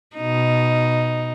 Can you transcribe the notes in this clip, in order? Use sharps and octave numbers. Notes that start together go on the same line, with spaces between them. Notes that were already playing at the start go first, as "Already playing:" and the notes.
B2 D#4